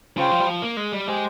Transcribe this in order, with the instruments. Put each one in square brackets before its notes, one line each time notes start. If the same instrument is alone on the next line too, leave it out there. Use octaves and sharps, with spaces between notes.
[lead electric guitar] C#3 [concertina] F4 C5 G5
[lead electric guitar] F3
G3
F3
A#3
G#3
G3
[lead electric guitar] G#3 [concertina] G4 C5 G5